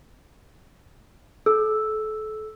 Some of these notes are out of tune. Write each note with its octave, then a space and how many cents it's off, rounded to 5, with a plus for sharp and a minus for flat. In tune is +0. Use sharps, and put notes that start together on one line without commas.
A4 -30 E6 +0